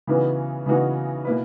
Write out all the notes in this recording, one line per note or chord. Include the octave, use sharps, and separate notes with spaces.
C#3 E3 B3 D#4 F#4
C#3 E3 B3 D#4 F#4
B2 A#3 E4 B4